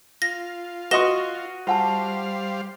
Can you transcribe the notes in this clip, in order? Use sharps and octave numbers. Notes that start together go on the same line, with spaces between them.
F4 A#6
F#4 B4 D#5 C6 C#6 A#6 E7 G7
G3 F4 C5 F5 F#5 A5